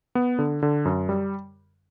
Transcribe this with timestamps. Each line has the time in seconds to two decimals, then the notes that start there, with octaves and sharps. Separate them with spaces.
0.15 B3
0.39 D3
0.62 D3
0.85 F#2
1.09 G3